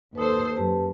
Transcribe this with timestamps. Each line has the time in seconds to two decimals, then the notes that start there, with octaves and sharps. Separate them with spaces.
0.15 D#2 A4 B4 C5 D#6
0.57 F#2 G4 B4 A5